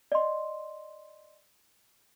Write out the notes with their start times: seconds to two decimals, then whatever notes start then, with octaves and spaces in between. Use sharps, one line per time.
0.12 D5 D#5 C6